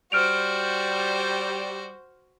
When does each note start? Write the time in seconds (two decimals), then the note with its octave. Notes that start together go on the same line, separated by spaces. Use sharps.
0.12 G3 F#4 C5 F6 D7 F7